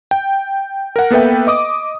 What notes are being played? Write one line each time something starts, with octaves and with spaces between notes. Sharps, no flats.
G5
A#4 F#5
A#3 B3 A4 B4 E5 G5
D#5 D6 D#6